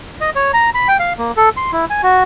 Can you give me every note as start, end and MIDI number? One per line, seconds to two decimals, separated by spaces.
0.21 0.30 75
0.35 0.52 73
0.54 0.70 82
0.74 0.88 83
0.88 0.97 79
0.99 1.13 77
1.18 1.32 58
1.37 1.49 69
1.57 1.71 84
1.72 1.85 64
1.90 2.02 80
2.03 2.23 66